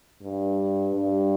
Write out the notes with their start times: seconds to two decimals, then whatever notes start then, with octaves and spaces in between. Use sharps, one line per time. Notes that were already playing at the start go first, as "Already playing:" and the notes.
0.21 G2
0.95 G2